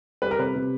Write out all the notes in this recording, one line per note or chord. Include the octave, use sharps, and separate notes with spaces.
G3 B4
A#4
C3 B4
C3